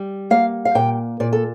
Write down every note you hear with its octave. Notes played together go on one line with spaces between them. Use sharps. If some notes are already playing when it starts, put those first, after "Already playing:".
Already playing: G3
A#3 F5
F5
A#2 G5
A#2 D5
A4